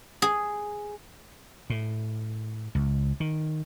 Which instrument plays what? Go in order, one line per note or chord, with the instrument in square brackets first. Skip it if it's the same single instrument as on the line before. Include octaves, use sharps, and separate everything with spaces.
[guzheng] G#4
[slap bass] A2
C#2
D#3